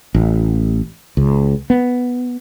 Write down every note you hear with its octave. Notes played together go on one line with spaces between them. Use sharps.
A1
C#2
B3